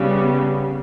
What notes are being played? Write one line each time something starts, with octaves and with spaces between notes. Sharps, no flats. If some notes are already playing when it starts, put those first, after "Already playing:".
Already playing: C#3 G3 B3